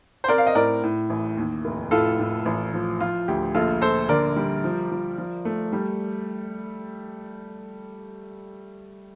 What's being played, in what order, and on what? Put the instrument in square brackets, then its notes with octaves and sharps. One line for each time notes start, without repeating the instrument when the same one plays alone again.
[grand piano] C5
[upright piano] C4 [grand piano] A#4 D5
[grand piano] F5
D#5
[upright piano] A2 [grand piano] A#4 D5
[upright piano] A2
A1
D#2
F1
[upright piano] A2 [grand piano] F4 A4
[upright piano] A2
A1
F3
[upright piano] F3 [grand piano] F4
[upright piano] D2 [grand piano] G4
[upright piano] A#1 [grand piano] F4 A4
[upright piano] A#1 [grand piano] A4 C5
[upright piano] D3 [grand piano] A#4 D5
[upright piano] G3
F3
F3
F3
A3
G3